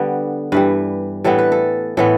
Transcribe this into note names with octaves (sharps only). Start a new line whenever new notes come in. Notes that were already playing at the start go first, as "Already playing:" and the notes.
Already playing: D3 G3 B3
G2 E3 G3 B4
A2 E3 G3 B3 A4
B4
A4
A2 E3 B3 A4